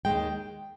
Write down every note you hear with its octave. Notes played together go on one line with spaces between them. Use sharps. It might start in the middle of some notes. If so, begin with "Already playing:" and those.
D#2 D#3 G#3 G5